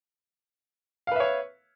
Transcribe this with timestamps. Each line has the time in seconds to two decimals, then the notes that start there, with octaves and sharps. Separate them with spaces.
1.07 F5
1.12 B4
1.16 E5
1.20 C#5